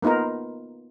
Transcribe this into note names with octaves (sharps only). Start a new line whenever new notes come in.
A#3 B3 D#4 F4 A#4